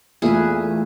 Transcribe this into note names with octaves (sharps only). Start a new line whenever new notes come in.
E2 A#2 A3 E4 F4 G#4 B4 E5